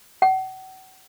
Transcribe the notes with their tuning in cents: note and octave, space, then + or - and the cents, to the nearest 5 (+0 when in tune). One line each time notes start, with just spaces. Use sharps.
F#5 +40